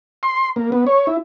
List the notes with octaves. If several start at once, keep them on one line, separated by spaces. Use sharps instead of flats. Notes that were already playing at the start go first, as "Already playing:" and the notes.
C6
A#3
B3
C#5
E4